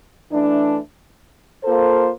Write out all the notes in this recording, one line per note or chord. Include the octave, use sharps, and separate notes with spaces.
E3 A3 D4
A#3 F4 A4 C5